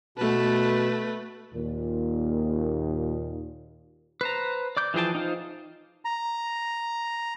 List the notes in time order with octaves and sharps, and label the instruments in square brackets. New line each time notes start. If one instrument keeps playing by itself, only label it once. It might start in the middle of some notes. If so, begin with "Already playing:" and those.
[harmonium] B2 A5 [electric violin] A3 B4
[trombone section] D#2 A#2
[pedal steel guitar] B4 C5 A#5
D5 D6 G6
E3 F3 G#4 G5 A5
D#4 F4 C5
[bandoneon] A#5